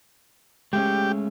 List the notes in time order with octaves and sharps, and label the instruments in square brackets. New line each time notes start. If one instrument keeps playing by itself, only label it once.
[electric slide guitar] G#3 A3 C#4 [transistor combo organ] G4